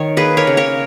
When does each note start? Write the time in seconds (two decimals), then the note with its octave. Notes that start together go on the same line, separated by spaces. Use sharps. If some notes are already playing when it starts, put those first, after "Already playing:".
Already playing: D#3 C#5
0.17 A#3 G#4 B4
0.37 A#4 C#5
0.47 C#3
0.57 A#4 C#5